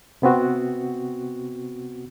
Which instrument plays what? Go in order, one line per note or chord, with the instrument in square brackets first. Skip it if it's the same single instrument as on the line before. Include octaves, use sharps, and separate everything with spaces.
[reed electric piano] C3 B3 C4 F#4